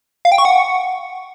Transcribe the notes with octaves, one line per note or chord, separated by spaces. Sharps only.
F5
G5
C#6
F#5